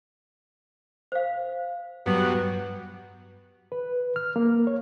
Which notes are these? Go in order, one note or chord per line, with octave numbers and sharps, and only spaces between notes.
C5 F5
G2 F#3 B3
B4
F6
A#3
C#5